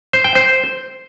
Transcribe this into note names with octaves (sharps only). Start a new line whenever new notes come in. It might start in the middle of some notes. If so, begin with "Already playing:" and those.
C5
G5
C5